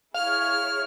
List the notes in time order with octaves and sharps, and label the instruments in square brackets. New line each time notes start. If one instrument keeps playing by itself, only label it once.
[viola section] E4 G#4 C#5 [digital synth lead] F5 [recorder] F6